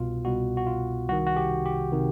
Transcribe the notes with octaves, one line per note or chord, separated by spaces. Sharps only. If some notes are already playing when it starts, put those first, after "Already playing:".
Already playing: C2 B2 F4
C2 B2 F#4
F#4
F4
C2 C3 D#3 F#4
F#4
G4
G4
C3 D#3